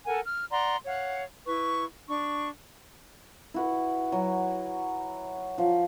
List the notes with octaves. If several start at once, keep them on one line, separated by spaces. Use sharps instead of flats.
A4 A#4 F#5 G#5
F6
D5 F#5 A#5 C6
C#5 F5 F#5
E4 B4 C#6
D4 C#6
E4 F#4 B4
F#3
F3